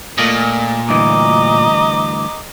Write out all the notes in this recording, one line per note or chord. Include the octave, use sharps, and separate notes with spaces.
A#2 A3 A#3 D#5
D2 G2 E3 D#5 A#5 D6